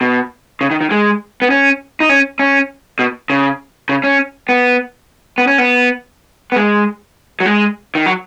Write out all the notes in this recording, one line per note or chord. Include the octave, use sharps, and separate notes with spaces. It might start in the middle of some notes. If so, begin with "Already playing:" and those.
B2
C#3
D#3
D#3
G#3
B3
C#4
D#4
C#4
C#4
B2
C#3
C#3
C#4
B3
B3
C#4
B3
B3
G#3
F#3
G#3
D#3
F#3